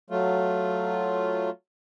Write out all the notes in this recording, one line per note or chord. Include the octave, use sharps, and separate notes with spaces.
F#3 A3 F4